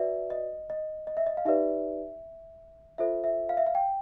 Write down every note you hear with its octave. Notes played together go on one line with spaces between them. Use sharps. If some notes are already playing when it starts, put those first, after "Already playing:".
Already playing: F#4 B4 D5 E5
D#5
D#5
D#5
E5
D#5
F5
D#4 G4 B4 D5 E5
F4 A4 C5 E5
E5
F5
E5
F5
G5